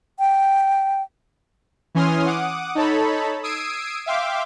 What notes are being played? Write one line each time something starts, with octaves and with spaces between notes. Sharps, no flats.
G5
E3 C#4 G#5 C6 D#6 F6
F#5 D6 D#6
D#4 A4 C#5 A5 B5
D#6 E6 G#6 C7 D7 D#7
E5 F5 G5 C6 D6